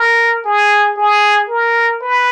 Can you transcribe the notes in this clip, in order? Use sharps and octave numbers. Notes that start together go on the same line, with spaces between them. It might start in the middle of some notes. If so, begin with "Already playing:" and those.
Already playing: A#4
G#4
G#4
A#4
B4